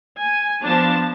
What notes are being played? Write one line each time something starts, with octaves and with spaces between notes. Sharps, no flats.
G#5
F3 B3 D4 A5